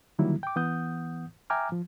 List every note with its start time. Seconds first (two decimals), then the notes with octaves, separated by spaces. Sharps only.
0.19 D3 D#3 F#3 G3 A#3 E4
0.43 G5 D6
0.56 E3 B3 F#5 D#6 G6
1.50 E5 G5 G#5 A#5 D6 F6
1.72 F3